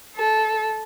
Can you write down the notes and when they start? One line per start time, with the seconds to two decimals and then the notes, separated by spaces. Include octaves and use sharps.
0.17 A4